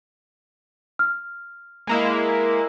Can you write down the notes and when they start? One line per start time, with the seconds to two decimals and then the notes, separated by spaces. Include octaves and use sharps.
0.99 F6
1.87 G#3 A#3 E4